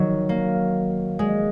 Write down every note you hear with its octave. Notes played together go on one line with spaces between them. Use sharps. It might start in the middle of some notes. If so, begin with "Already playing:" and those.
Already playing: D#3 F#3
A#3
G#3